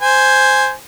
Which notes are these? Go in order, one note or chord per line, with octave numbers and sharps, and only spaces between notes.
C5 G#5